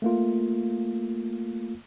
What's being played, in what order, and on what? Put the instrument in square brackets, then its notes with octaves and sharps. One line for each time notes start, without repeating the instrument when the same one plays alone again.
[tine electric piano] A3 A#3 F4